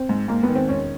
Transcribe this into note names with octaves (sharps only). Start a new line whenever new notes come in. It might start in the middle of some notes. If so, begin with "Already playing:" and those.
Already playing: C4
G#2
G#2 A#3
B3
D#3
C4
E1 C#4